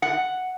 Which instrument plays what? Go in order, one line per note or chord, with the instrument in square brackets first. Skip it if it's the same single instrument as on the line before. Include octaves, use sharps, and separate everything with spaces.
[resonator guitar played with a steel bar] F#5